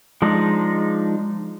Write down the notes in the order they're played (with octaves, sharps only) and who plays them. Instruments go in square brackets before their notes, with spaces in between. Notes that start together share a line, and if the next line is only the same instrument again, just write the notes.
[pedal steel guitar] F3 G#3 D4 D#4